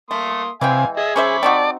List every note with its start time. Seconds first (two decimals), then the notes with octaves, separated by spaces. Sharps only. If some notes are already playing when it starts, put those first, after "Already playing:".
0.11 A3 A#3 C6 D#6
0.61 C3 E3 G#3 F5 G5 G#5
0.97 G#4 D#5 E5
1.16 C#4 C5 E5 B5 C#6 D6
1.43 C4 D#4 F#4 D5 A5